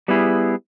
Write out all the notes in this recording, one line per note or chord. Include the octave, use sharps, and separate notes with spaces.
G3 B3 E4 G#4